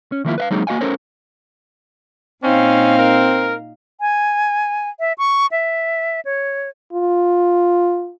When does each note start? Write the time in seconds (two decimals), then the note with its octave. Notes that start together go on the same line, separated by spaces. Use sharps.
0.12 C#4
0.25 D#3 F3 A#3 D4 E4 F4
0.38 B4 E5 F5
0.51 F#3 G#3 A#3 C4 D#4 G#4
0.67 A#3 F#4 D#5 F5 G#5
0.81 C#4 A4 A#4 C5 C#5
2.44 A#2 C4 C#4 D#4 F5
2.99 A#4
4.01 G#5
5.00 E5
5.18 C#6
5.52 E5
6.25 C#5
6.93 F4